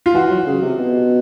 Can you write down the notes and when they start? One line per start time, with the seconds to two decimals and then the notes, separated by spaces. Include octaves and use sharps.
0.06 F4
0.14 E3 F#4
0.31 F#3
0.47 C#3
0.62 C3
0.79 B2